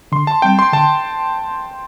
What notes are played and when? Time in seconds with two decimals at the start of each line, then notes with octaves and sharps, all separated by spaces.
0.12 D3 C6
0.27 A5
0.42 G3 C4 G5
0.59 C6
0.73 D3 A5